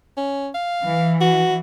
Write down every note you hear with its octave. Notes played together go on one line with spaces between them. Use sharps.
C#4
F5
E3
F#4